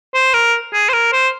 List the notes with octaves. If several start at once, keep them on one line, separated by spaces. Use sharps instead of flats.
C5
A#4
G#4
C5
A#4
C5